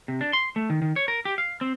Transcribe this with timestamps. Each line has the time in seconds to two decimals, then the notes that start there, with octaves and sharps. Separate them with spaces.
0.08 C3
0.21 D4
0.33 C6
0.56 A3
0.70 D#3
0.82 D#3
0.96 C#5
1.08 A#4
1.25 G4
1.38 F5
1.61 C4